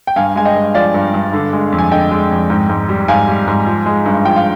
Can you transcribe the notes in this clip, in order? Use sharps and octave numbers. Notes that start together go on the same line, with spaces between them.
G5
G2 F5 G#5
G#3 G#5
D#5 G5
G2
F3 D5 F5
G2
G2
D3
G#3
F2
G#5
D3 D#5 G5
G#3
F2
G#2
G#2
G3
G#2 F5 G#5
G3
G#2
F3
G#3
G2
F3 G5
F5